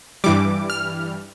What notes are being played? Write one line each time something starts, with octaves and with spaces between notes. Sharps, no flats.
G2 E3 G3 D6
F6